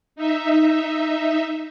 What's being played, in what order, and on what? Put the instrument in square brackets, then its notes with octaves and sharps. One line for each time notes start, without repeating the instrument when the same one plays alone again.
[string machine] D#4 E5